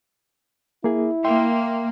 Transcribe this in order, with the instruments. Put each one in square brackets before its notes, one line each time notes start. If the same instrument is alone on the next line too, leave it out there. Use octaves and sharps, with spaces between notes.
[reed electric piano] A#3 G#4 [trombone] E4
[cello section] A#3 [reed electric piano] E5 G5 C6